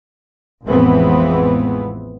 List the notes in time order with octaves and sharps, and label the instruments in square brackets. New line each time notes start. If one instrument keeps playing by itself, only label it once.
[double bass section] A1 F2 E3 G#3 B3 C4